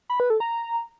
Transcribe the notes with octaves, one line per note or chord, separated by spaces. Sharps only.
B5
B4
A4
A#5